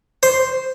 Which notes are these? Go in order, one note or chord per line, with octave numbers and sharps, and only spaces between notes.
C5